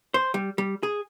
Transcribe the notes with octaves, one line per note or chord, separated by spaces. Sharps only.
C5
G3
G3
G#4